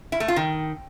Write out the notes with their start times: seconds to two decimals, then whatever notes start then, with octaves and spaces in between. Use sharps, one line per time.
0.12 E4
0.20 A3
0.28 F4
0.36 D#3